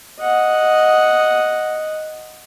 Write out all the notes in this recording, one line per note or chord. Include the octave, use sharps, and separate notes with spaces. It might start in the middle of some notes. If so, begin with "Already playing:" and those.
D#5 F#5